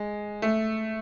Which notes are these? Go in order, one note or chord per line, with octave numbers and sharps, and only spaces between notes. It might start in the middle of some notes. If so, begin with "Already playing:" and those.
Already playing: G#3
A3